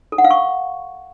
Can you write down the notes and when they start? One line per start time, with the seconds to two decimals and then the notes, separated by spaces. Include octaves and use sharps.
0.12 A4
0.18 F#5
0.24 F5
0.31 C#6